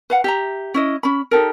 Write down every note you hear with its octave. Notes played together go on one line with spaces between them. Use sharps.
B4 F5 F#5
G4 E5 A#5
C#4 E4 D#5
C#4 B5
D#4 G4 A4 A#4